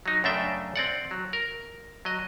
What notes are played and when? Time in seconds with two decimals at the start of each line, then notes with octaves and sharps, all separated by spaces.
0.06 F#3 D#4
0.24 F#2 C#3 A3 D4 E5 G5
0.76 C4 D5 F#5
1.11 F#3
1.33 A#4
2.05 F#3 D#5